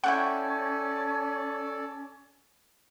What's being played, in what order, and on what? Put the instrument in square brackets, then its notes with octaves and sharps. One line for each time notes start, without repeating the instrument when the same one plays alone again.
[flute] C#4 [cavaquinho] E4 G5 C#6 [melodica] A4 D5 [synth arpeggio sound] F#5